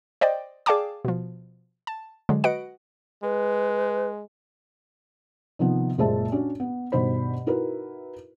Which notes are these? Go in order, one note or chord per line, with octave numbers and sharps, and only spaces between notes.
C5 D5 D#5 G5
G#4 D5 F5 G5 A5 D6
B2 F3
A5
D3 F#3 G#3
F#4 B4 D#5 F#5 D7
G#3 B4
C3 D#3 F3 B3
F#1 A#2 G#3 C5 E5 A5
C#4 D4 F#4
B3
G2 B2 D#3 C5 B5
D#4 E4 F#4 A#4 B4